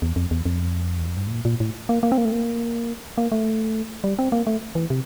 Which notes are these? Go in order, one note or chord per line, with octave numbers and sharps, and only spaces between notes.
E2
F2
E2
F2
E2
F2
G2
A2
A#2
A#2
A2
A#3
A#3
C4
A#3
A3
A#3
A#3
A3
G3
C4
A#3
A3
E3
C3